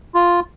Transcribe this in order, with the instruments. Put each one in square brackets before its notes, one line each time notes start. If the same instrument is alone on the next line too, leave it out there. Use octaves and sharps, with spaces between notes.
[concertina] F4